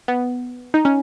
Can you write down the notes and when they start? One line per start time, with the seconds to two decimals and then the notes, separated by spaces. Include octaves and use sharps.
0.08 B3
0.74 D#4
0.85 C#4